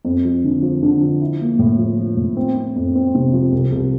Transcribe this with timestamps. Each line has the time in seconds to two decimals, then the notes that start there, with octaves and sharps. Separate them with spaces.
0.04 F2
0.25 F3
0.44 D3
0.63 F3
0.83 D3
1.01 F3
1.21 E4
1.41 A#3
1.59 A2
1.79 F3
1.98 F3
2.17 A2
2.37 C4
2.56 C4
2.76 F2
2.95 C4
3.15 C3
3.33 F3
3.53 C2
3.72 C2